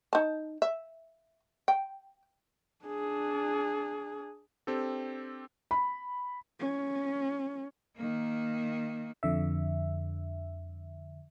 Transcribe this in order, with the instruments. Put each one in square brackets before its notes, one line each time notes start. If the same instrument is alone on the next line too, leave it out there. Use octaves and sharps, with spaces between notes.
[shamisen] D#4 A5
E5
G5
[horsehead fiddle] D4 G#4
[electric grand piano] C4 D4 G4 A4
[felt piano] B5
[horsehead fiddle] C#4
[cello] D#3 A#3
[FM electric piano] F2 D3 E5